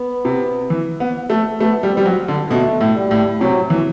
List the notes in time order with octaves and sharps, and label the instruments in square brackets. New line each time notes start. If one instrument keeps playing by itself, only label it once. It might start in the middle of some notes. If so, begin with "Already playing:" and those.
Already playing: [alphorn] B3
[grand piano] C3
E3
B3
A3
[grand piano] A3 [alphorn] B3
[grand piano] G3
[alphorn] C4
[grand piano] G3
F#3
D3
[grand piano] B2 [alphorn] A3
[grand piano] A2
[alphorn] G3
[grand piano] A2
[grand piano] C3 [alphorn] F#3
[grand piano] E3